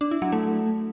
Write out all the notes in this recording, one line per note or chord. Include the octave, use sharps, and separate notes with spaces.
D4
E4
F#3
A3